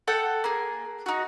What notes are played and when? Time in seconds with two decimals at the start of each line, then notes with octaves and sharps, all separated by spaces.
0.08 A4 F#5 G5
0.44 A#3 G#4
1.06 D#4 F#4